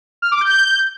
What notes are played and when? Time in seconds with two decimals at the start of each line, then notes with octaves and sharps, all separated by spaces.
0.22 F6
0.32 D6
0.41 G6